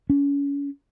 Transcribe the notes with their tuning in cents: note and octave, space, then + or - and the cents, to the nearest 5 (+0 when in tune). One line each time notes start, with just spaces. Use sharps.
C#4 +30